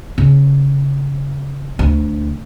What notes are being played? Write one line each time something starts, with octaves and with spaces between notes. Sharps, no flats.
C#3 C#4
D2